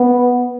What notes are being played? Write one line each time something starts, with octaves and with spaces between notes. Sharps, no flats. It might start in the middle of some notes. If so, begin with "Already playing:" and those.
Already playing: B3